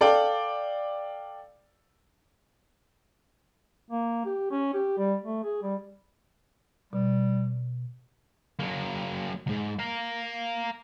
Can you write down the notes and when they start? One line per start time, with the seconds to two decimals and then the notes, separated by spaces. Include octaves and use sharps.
0.01 A4 D5 F5 G5
3.91 A#3
4.25 G4
4.51 C#4
4.74 G4
4.98 G3
5.24 A3
5.44 G#4
5.62 G3
6.93 B2 G3
8.59 F#3 A#3
9.47 C#2 G#2
9.79 F5 A#5